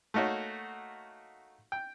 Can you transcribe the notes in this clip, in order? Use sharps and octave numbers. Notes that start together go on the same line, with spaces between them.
A3 A#3 D#4 F#4 C#5
G5